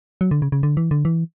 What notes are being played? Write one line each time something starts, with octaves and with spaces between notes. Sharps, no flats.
F#3
D3
C#3
C#3
D3
E3
D3
E3